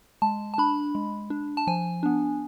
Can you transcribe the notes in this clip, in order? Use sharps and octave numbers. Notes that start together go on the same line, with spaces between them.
G#3 A5
A5
D4 B5
G#3
D4
A5
F3 G#5
B3 D4